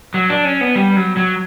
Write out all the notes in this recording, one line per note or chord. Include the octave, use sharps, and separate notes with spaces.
F#3
D4
C#4
B3
G3
F#3
F#3